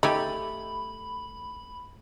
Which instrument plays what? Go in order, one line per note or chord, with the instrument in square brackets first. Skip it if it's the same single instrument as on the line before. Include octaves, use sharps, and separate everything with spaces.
[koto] A3 G4 G#5 [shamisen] D#4 [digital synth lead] B5